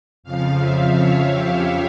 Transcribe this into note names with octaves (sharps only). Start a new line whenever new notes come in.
F2 C#3 F3 F5
E5
C#5
G4